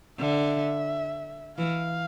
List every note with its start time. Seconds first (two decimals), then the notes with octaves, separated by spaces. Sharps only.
0.19 D3 E5
1.58 E3 F5